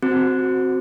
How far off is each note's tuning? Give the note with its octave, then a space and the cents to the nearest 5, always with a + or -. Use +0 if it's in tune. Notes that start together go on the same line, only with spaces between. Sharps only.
C4 +0 F#4 +0